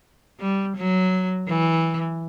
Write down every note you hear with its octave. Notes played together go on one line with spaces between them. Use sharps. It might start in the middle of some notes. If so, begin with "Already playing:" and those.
G3
F#3
E3